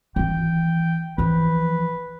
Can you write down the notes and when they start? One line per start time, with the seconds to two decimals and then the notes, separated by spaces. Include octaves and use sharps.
0.16 D#3 E3 G5
1.18 E3 F3 B4